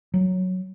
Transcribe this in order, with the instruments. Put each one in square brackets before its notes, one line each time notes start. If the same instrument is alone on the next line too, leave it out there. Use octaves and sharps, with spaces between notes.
[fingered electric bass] F#3